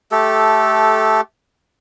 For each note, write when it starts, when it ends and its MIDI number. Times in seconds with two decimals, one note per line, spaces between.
0.12 1.21 57
0.12 1.21 67
0.12 1.21 69